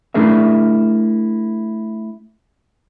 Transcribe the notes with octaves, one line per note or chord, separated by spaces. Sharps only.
A3 D4 E4 G#4 A#4 E5